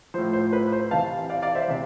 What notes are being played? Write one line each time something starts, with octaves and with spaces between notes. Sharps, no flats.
A2 F3 C5
C5
B4
C5
C3 E3 F5 A5
D5 F5
D5 F5
C5 E5
C3 E3